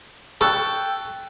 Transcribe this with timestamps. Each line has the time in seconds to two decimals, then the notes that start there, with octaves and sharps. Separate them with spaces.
0.41 A4 G5 C#6 E6 F#6